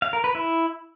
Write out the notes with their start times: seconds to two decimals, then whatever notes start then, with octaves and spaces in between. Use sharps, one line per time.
0.02 F5
0.13 A#4
0.24 B4
0.35 E4